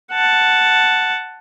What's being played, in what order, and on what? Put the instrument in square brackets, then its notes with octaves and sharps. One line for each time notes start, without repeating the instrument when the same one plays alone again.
[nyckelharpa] F#5 A5